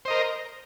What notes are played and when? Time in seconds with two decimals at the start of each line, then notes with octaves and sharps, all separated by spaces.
0.05 C5
0.08 D#5
0.10 A#4